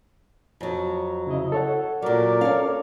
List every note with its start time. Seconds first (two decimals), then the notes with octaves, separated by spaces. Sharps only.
0.61 F2 F#3
1.27 C#3 E4 D#5
1.52 A4 C#5 F#5
2.02 A#2 F#3 A#4 D5
2.41 C#4 A4 C#5 F5